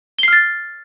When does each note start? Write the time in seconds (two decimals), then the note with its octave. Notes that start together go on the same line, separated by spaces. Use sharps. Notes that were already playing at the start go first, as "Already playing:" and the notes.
0.19 G7
0.23 C7
0.28 F6
0.33 A6